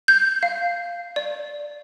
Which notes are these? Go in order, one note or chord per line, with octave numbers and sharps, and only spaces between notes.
G6
F5
D5